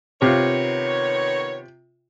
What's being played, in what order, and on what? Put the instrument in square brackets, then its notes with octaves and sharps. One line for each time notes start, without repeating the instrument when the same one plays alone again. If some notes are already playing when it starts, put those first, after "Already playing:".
[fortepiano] C3 F4 [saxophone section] D#3 B3 C#5